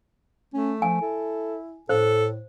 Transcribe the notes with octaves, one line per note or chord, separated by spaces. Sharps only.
A3 C#4
F3 G#5
E4 A4
A2 A4 C5